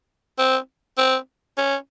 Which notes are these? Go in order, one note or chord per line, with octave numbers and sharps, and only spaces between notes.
C4
C4
C#4